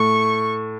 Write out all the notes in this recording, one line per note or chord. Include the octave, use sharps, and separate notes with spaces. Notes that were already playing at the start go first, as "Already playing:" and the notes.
Already playing: A2 C#6